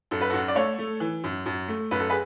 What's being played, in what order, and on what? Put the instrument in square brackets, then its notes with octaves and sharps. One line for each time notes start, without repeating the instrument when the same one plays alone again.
[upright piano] F#2 A4
B4
F#4 A4
F#2
D5
A3 A4 C#5
A3
E3
F#2
F#2
A3
F#2 B4
A4
G#4 B4